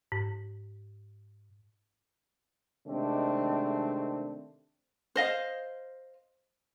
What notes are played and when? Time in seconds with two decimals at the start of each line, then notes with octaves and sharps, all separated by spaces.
0.12 G#2
2.87 C3 D#3 G#3 A3 C4 D4
5.16 C5 D#5 F5